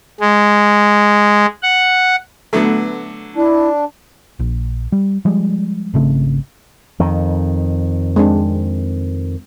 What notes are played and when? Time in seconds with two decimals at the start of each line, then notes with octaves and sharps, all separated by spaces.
0.20 G#3
1.63 F#5
2.53 D3 F#3 A3 B3
3.36 D4 E4
4.40 A#1
4.92 G3
5.25 F3 G3 G#3
5.94 G#1 C#3 A3 C4
6.99 F2 D#3
8.16 G#3 C4 D4